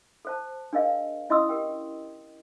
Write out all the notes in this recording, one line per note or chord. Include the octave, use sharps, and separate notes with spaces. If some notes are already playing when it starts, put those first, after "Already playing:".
A4 C5 A5
D4 G#4 A#4 D#5 F5
C#4 E4 D#5 C6 D#6 E6
G4 A#4 G5